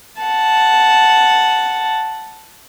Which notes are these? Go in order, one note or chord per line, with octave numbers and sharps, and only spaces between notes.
F#5 A5